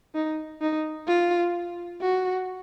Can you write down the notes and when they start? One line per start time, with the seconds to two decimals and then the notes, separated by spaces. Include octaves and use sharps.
0.15 D#4
0.62 D#4
1.08 F4
2.01 F#4